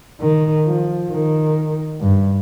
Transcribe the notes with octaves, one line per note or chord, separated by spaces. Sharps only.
D#3
F3
D#3
G2